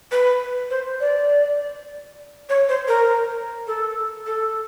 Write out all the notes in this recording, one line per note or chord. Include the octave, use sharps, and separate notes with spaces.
B4
C5
D5
C#5
C5
A#4
A4
A4